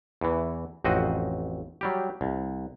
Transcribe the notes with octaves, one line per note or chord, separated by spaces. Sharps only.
E2 E3
A1 F2 C4 F#4 D#5
F#3 G3 G4
C2